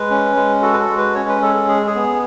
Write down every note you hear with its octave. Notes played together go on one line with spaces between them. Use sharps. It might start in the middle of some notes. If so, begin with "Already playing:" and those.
Already playing: G#3 B4
C#4
G#3
F#4 A4
B4
A4
G#3
B4
C#4 C#5
B4
G#3 A4
A4
G#4
G#4
B3